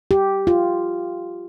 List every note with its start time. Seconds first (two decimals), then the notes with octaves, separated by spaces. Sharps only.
0.11 G4
0.47 F4